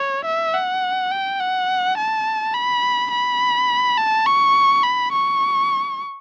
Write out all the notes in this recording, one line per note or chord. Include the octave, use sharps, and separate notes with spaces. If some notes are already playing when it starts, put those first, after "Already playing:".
Already playing: C#5
E5
F#5
G5
F#5
A5
B5
B5
A5
C#6
B5
C#6